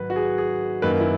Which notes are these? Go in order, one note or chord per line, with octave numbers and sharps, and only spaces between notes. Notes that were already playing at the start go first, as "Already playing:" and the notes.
Already playing: G#2 D#3 F#3 B4
F#4
G#4
G#4
F#2 D#3 A#3 B4
E4